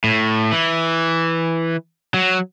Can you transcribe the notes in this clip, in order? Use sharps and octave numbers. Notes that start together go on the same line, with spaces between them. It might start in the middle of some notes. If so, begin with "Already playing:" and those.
A2
E3
F#3